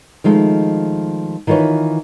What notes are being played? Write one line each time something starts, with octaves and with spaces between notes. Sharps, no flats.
D#3 F3 G#3 A3
D#3 E3 F4 B4 C#5